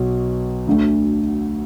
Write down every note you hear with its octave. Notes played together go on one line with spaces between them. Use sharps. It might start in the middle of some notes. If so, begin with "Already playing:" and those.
Already playing: B1 B2
D2 D3 A3